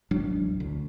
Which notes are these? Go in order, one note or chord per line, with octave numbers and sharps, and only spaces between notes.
E1 A1 F#3 D4
D2